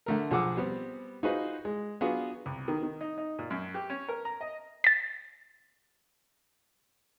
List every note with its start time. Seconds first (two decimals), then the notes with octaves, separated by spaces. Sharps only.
0.06 D3 A3 A#4
0.31 B1 F3 G#4 F#5 D6 E6
0.57 G3 B3 C4
1.23 D#4 F4 F#4 G#4 B4 C5
1.65 G#3
2.01 F#3 B3 D4 F4 F#4 G#4
2.46 C2
2.68 D#3
2.83 D#3
3.01 D#4
3.18 D#4
3.39 A#2
3.50 F#2
3.75 G4
3.90 C#4
4.08 A#4
4.25 A#5
4.41 D#5
4.84 A6 B6